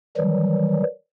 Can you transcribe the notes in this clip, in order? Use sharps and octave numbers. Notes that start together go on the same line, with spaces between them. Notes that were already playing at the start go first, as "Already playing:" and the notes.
D#3 E3 F#3 G3